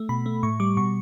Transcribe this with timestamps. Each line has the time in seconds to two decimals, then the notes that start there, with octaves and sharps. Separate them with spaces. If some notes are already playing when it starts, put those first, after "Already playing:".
Already playing: A3
0.09 B2 B5
0.26 A3
0.43 A2 C#6
0.60 G3 D6
0.77 B2 C#6